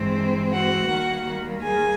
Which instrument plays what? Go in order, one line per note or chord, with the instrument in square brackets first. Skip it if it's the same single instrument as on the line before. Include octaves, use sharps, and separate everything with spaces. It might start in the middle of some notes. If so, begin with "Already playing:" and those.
Already playing: [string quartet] G2 E3 G#3 C4
F#4 F#5
D#2 D#3 G3 A#3
G#4 G#5